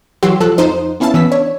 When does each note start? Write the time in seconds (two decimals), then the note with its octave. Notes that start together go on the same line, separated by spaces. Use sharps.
0.23 E3 F#3 F#4 G4 C6 E6
0.40 F3 A4 E6 F#6
0.58 F2 F3 D#4 C5
1.00 B3 C#4 E4 F5 A5
1.14 E3 B3 C#4 E6 B6
1.32 D4 C#5